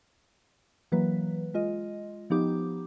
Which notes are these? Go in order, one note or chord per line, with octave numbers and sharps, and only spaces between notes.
E3 F#3 A#3 B4
G#3 F4 D#5
F3 B3 D#4 G4 D6